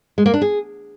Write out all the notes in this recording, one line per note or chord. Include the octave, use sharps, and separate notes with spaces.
G#3
A#3
D4
G#4